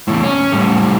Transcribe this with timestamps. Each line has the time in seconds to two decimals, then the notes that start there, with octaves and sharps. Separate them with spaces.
0.08 E2 A2
0.23 C#4
0.53 A2 G3